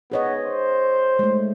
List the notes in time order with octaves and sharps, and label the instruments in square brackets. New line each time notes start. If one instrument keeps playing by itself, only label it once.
[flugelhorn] B3 [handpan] G#4 C#5 D#5
[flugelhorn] C5
[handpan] G#3 A3